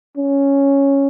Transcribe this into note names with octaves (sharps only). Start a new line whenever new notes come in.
C#4